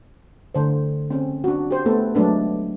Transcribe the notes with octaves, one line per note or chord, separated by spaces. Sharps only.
D3 C5
C4 C#4
D4 F#4
G4 C5
A3 B3 A4
F#3 G#3 A3 D4 B4